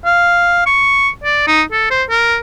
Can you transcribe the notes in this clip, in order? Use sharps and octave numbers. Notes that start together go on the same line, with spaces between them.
F5
C#6
D5
D#4
A4
C5
A#4